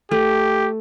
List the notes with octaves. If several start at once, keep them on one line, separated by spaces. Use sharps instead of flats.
A3 G4